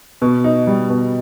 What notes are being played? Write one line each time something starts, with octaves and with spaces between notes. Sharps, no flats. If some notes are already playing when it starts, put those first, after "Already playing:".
B2
D#4
G3
B2